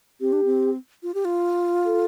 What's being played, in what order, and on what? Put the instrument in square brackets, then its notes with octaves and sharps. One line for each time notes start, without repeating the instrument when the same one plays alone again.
[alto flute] C4 [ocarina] G4
[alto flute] D4
C4
F4
G4
F4
[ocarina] A4